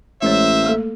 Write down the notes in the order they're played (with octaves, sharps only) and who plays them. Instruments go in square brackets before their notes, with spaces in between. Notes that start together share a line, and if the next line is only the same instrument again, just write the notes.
[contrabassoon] A1 [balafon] G#3 C#5 [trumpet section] A#4 C5 E5
[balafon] A3 A#3 A4